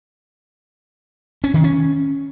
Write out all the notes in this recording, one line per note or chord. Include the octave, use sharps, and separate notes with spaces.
C#4
D#3
C#4